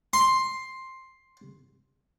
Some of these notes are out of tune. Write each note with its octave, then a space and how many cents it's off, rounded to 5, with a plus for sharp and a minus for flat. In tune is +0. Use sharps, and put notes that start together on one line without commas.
C6 +10